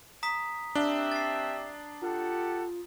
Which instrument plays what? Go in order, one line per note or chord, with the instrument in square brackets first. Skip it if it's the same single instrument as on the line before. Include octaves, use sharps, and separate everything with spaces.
[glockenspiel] A#5 D#6 B6
[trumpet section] C4 G4 E5 [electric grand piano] D4 [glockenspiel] G7
[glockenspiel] A6 C7
[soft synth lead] F4 [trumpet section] G4 A4 F#5